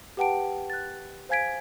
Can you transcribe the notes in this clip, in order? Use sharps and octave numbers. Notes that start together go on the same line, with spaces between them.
G4 B4 F#5 G5 A5 D7
F#6 A6
C5 F5 G#5 G#6 B6 D7